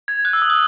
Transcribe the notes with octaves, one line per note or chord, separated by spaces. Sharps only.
G#6
F#6
E6
D#6
F#6